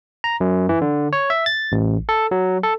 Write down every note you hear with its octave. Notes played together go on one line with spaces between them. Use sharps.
A#5
F#2
E3
D3
C#5
E5
A6
A1
A4
F#3
A4